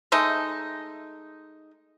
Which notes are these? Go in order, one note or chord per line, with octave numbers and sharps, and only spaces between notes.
G#3 A3 D#4